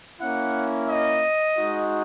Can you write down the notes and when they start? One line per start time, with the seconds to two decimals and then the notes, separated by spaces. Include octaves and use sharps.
0.21 A#3 C#4 E4 F#5
0.89 D#5
1.57 G#3 D#4 F#4